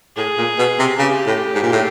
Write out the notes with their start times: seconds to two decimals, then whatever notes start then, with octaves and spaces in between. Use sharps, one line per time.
0.17 A2 G#4
0.38 A#2
0.59 B2
0.79 C3
0.99 C#3 G4
1.26 A2
1.54 G#2
1.63 A#2
1.72 A2